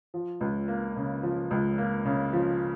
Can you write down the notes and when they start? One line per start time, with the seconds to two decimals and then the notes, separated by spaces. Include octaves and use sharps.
0.14 F3
0.41 C#2
0.68 A#3
0.96 C#3
1.23 F3
1.51 C#2
1.78 A#3
2.05 C#3
2.33 F3